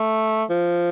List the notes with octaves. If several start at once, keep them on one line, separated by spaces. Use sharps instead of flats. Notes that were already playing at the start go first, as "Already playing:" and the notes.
Already playing: A3
F3